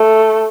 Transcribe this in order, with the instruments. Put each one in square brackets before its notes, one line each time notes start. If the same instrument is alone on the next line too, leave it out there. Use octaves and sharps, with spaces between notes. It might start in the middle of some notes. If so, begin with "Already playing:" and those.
Already playing: [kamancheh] A3